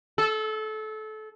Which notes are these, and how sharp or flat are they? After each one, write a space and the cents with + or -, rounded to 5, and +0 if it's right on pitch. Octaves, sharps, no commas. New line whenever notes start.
A4 -25